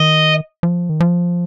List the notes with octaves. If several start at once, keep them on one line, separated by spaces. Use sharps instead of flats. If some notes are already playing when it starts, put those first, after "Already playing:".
Already playing: D#3 D#5
F3
D#3
F3